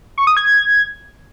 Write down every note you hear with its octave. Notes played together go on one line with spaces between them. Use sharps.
C#6
D#6
G#6